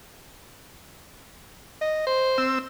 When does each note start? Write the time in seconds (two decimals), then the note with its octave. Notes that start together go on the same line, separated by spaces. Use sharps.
1.81 D#5
2.07 C5
2.38 C4 E6